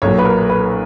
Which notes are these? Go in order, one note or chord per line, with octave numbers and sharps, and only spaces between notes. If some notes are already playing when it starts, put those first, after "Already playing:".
B1 A#2 F#3 C#5
B4
A#4
B4